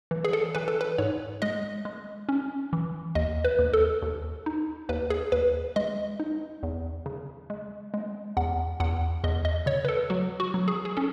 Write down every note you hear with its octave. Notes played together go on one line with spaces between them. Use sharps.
E3
G#4
A4
E3 B4
A4
B4
G#2 C#5
G#3 D#5
G#3
C#4
E3
D#2 D#5
B4
D#2
A4
D#2
D#4
D#2 B4
G#4
D#2 B4
G#3 D#5
D#4
E2
C#3
G#3
G#3
E2 F#5
E2 F#5
E2 D#5
D#5
C#3 C#5
B4
A4
F#3 F#4
F#4
F#3
G#4
G#4
C#4 A4